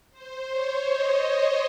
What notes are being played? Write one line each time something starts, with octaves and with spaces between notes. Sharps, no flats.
C5
C#5
D#5